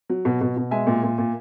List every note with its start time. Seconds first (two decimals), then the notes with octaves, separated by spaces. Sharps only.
0.10 F#3
0.25 B2
0.41 B2
0.57 B2
0.71 G#3 E5 G#5
0.87 A#2
1.03 A#2
1.18 A#2